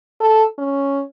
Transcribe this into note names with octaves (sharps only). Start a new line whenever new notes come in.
A4
C#4